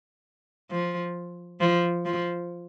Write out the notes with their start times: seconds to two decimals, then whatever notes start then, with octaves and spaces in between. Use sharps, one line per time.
0.71 F3
1.60 F3
2.05 F3